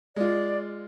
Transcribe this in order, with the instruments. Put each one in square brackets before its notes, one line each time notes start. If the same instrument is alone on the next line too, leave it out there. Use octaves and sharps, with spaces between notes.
[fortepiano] G#3 F4 [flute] D5